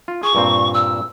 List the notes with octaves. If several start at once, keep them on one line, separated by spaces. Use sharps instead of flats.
F4
G#4 C#6
G2 A#2 C4
E6